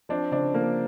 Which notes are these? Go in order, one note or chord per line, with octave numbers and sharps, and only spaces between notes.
F3 C4 D4
C#3 C4 D4
F3 A#3